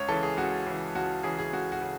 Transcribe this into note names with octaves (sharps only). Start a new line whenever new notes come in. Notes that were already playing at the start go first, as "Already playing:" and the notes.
Already playing: C#2 C#5
C#3 E3 A4
G#4
C#2 F#4
C#3 E3
C#2 F#4
C#3 E3 G#4
G#4
C#2 F#4
F#4
C#3